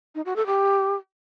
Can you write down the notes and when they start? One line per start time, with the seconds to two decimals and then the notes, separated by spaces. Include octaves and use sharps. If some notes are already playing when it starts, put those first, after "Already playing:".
0.15 D#4
0.25 F#4
0.36 A4
0.47 G4